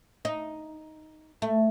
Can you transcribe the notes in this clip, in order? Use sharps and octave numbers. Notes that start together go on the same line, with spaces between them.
D#4
A3